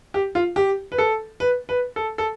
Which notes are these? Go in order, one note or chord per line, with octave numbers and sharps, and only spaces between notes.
G4
F4
G4
B4
A4
B4
B4
A4
A4